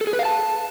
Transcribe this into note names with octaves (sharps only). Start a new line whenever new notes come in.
A4
G#4
B4
F5
A5